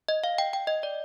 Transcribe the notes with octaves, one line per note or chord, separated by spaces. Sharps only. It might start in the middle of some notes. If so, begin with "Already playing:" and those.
D#5
F5
G5
G5
D#5
D5